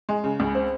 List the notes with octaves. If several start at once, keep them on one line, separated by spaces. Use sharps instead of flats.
G#3
C#3
C#2
C4